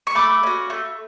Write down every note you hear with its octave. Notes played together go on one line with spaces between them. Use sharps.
C#6
A3 B5 D6
C#4 F#4
A3